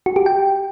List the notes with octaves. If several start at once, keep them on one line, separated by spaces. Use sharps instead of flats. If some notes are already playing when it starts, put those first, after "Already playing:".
F#4
G4
G5